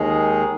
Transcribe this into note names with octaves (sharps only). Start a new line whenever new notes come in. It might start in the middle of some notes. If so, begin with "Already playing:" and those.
Already playing: D#2 D#3 G#3 D#4 G#4